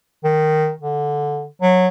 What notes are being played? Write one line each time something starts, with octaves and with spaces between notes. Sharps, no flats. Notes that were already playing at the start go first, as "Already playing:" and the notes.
D#3
D3
F#3